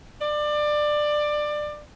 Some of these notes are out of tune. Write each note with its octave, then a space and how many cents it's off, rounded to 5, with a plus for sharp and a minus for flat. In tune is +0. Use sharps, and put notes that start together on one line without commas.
D5 +20